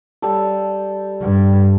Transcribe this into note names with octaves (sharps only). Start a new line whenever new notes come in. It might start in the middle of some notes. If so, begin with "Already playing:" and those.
G3 A4
G2